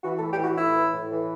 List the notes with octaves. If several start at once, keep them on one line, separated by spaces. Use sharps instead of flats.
E3 F#4
A4
A2
G4
E3 F#4
A2 E4
E3
A2
E3